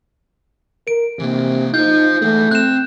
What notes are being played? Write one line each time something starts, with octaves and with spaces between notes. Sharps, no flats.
A#4 D7
C3 E3 A#3
D#4 F4 C5 G6
E3 A3 G#4
C4 F#6 E7